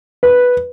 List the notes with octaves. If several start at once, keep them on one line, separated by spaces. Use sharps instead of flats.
B4